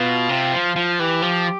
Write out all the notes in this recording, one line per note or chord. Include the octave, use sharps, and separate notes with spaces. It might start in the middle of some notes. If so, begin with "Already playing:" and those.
Already playing: B2 F4
C3
F3
F3
E3 G4
F3